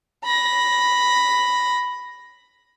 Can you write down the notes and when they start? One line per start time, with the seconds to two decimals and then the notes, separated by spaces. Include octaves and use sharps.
0.25 B5 A#6